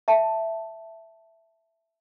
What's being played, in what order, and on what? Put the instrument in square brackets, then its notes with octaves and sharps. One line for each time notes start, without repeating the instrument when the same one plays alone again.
[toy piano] E5 A5